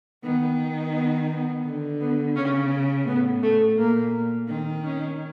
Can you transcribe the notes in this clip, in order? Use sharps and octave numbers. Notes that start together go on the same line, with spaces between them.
D#3 B3
B3
B3
D3
B3
C#3 C#4
A2 B3
A3
A#2 A#3
D#3 C4
C#4